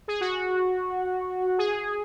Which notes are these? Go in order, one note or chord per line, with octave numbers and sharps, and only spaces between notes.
G#4
F#4
G#4